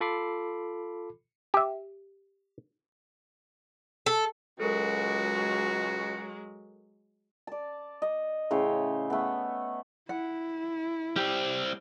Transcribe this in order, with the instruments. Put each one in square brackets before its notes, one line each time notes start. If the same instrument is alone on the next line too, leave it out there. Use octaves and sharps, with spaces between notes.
[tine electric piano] F4 A4 B5 D6 C7
[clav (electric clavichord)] G4 E5
[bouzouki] A4
[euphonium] C#2 [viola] F#3 G#3 [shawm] F#4 [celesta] A4 A#4
[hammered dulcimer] D5 A5
D#5
A2 C#3 C5 C#5
A3 B3
[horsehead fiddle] E4 [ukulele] F#5
[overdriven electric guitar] G3 C4 [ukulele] G4